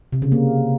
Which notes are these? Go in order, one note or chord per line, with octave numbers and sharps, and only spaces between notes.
C3
C#3
A#3